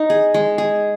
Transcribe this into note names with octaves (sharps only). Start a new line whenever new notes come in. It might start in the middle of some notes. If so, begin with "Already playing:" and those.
Already playing: D#4
G#4
G#3
G#4